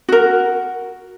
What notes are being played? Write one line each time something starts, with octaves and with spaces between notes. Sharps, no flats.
F#4 A#4